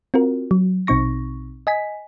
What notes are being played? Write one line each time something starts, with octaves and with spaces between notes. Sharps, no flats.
C4 F4 F#4 A#4
F#3
A#1 B2 C4 D#4 C#6 A#6
D#5 G#5 B6